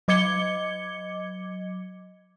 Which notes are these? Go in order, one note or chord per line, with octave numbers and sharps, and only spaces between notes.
F#3 D#5 D6 G#6 C#7 G7